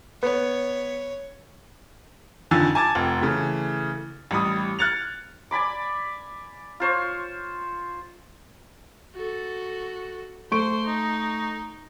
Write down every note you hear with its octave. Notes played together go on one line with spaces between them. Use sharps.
B3 C#5
F2 D3 D#3 G#5 E6 A6
G#5 A5 D6 G#6 A6
F1 C4
C#3 E3 A3
A1 G3 B5 D#6
F6 F#6 G#6 A6 C#7 F7
D5 G#5 B5 D6
F4 C5 C#5
F#4 A4
A3 C5 C6 C#6 D7
D#4